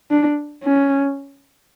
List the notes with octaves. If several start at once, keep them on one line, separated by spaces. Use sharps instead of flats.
D4
C#4